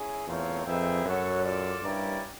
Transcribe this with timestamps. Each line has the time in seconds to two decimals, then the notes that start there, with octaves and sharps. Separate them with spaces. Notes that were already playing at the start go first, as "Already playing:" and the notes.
Already playing: C#4 E4 G#4
0.27 E2 A3 C4 F4 A#4 C#5
0.66 F2 D#4 G#4 B4 E5 G5
1.05 F#2 F#4 A4 C#5 F#5
1.43 F4 A4 D5
1.83 G2 C#4 E4 G4 A#4 D5